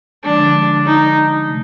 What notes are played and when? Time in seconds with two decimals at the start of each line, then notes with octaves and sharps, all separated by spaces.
0.24 D3 F3 G#3 D4
0.86 D#4
1.48 C3 A3